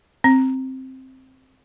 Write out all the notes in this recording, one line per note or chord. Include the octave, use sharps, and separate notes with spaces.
C4